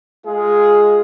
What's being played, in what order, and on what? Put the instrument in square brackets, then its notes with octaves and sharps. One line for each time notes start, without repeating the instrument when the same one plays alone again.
[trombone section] G#3 F4 G#4